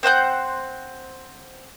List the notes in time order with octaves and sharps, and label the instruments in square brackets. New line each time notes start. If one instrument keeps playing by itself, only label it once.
[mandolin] C4 C5 F#5 G6